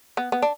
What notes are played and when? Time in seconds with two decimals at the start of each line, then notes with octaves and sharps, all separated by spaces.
0.17 B3
0.32 B3
0.42 D4